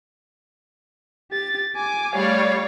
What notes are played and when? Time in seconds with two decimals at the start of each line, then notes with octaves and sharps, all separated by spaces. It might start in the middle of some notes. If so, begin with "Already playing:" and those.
1.31 G4 A6
1.76 G#5 D6
2.16 G3 A3 C#5 D5 F5